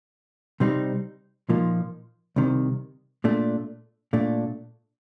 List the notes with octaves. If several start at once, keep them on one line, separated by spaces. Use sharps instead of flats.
C3 G3 C4 D#4
A#2 F3 A#3 D#4
C2 C3 D#3
A#2 A3 D4
A#2 A3 D4